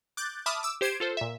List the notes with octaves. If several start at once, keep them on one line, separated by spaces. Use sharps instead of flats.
D6 F#6 G6 A6
E5 A5 B5 D6 D#6 F6
D6 E6
G4 C5 G#6 C7 D7 E7
F4 A4 C5
A#2 E5